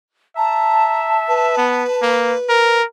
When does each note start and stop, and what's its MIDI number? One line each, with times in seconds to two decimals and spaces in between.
0.36 1.53 76
0.36 2.07 81
0.36 1.14 82
1.28 2.79 71
1.57 1.84 59
2.02 2.35 58
2.49 2.84 70